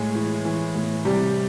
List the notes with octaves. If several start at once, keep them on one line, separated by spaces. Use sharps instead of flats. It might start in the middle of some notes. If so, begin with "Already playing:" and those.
Already playing: A2 G#3 G#4
E3
E3
A2
C3 G3 G4